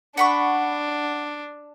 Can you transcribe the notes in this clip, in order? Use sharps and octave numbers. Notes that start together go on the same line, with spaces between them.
D4 F#5 B5 C#6